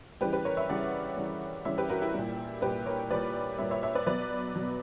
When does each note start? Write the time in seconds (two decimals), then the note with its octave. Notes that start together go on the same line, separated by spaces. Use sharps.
0.21 C#3 E3 G3 G4 B4
0.33 G4 B4
0.45 A#4 C#5
0.57 C#5 E5
0.69 C#3 E3 G3 D5 F#5
1.17 C#3 E3 G3
1.65 C#3 E3 G3 C#5 E5
1.78 G4 B4
1.89 F#4 A#4
2.02 E4 G4
2.14 A#2 G3
2.62 A#2 G3 G4 B4
2.86 A#4 C#5
3.10 A#2 G3 B4 D5
3.58 A#2 G3 C#5 E5
3.71 C#5 E5
3.83 C#5 E5
3.95 B4 D5
4.07 B2 F#3 B4 D5
4.55 B2 F#3